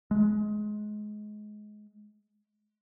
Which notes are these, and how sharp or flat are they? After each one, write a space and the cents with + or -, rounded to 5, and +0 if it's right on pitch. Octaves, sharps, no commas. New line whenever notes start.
G#3 +20